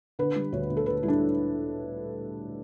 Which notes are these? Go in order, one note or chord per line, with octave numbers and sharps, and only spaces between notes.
D3 B4
G3
D2 C#5
D2
A4
D3 B4
G3 E4
D4